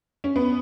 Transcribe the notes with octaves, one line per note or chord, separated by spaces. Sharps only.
C#4
B3